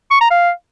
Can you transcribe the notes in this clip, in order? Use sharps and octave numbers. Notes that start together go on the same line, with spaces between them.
C#6
A#5
F5